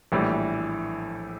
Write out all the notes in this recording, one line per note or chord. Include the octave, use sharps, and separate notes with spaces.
A#1 A2 E3 G3